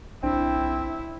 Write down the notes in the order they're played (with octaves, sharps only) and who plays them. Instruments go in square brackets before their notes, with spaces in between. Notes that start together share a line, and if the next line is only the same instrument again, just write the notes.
[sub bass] B1 [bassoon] C4 [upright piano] D4 [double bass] E4